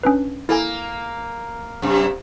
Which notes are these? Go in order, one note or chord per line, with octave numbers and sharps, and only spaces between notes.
C#4 D4 B4
A#3 E4 A4 G#5
F#2 C3